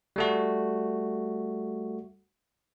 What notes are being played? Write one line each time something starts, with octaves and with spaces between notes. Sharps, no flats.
G3 A3 F#4